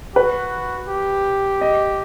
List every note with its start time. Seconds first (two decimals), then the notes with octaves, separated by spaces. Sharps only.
0.15 F#4 B4
0.88 G4
1.61 D#5